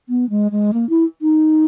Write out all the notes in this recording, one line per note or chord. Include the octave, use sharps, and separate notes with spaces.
B3
G#3
G#3
A#3
E4
D#4